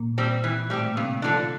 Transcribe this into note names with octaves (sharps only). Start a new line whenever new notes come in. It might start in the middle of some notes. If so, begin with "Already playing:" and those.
Already playing: A#2 A#3
G3 C4
E3
A2 G3 A3 C4 G4
A#3
G2 C3 C4
D3 F3 A#3 D4